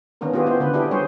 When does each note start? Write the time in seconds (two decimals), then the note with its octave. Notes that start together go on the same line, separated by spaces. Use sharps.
0.21 D#3 B3 C#4 D4 A#4
0.33 B3 F4 G4 G#4
0.46 B3 E4 C5
0.60 D3 B4
0.74 D4 E4 G4 G#4
0.91 G3 G#4 C5 C#5